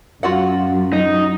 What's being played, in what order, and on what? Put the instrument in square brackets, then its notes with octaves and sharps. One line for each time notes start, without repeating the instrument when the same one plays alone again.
[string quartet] F#2 [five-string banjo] F4 F#4 F#5
[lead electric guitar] D#4